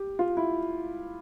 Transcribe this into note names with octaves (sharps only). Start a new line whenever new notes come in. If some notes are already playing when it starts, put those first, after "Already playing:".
Already playing: G4
F4
E4